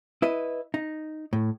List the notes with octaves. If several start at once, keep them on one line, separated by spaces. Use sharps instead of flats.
E4 B4 D#5
D#4
A2